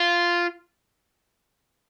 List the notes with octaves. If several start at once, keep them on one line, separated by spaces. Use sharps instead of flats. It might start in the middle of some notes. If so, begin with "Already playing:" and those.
Already playing: F4